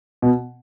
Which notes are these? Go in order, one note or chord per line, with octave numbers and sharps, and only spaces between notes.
B2